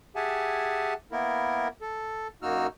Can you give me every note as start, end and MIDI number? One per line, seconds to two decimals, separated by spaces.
0.16 0.94 67
0.16 0.94 68
0.16 0.94 76
0.16 0.94 78
0.16 0.94 80
0.16 0.94 81
1.12 1.68 58
1.12 1.68 59
1.12 1.68 64
1.12 1.68 70
1.81 2.28 69
2.43 2.67 42
2.43 2.67 58
2.43 2.67 63
2.43 2.67 66
2.43 2.67 88
2.43 2.67 89